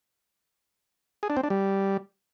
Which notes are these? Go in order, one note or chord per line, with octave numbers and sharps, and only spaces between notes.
G#4
D4
C4
D4
G3